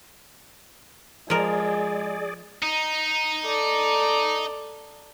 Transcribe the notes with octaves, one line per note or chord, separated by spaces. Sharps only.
F3 G#3 G#4 A#4 D5
D#4
A4 D5